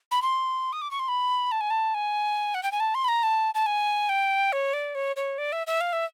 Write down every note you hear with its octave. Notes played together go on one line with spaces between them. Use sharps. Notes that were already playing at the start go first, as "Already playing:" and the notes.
B5
C6
D#6
D6
C#6
C6
B5
A5
G#5
A5
G#5
F#5
G5
G#5
A5
C6
B5
A#5
A5
A5
G#5
G5
C#5
D5
C#5
C#5
D5
E5
E5
F5
E5